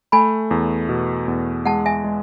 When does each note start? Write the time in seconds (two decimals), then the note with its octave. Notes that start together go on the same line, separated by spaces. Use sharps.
0.12 A3 G#5 B5
0.51 E2
0.89 B2
1.28 E2
1.65 G#3 F#5 A5
1.86 E5 G#5
2.04 G#3